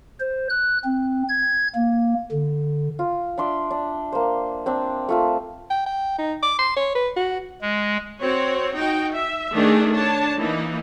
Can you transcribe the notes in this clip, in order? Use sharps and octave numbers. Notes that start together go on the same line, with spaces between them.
C5
F#6
C4
G#6
A#3
D3
F4
D4 E5 C6 D6
D4
A#3 C5
C4 D4
A3 F4 A5
G5
G5
D#4
D6
C6
C#5
B4
F#4
G#3
C4 F#4 C#5
D#4 F#4 G5
E5
D#3 A3 D4 G#4 A#4
D4 C#5 A5
E3 A#3 D#4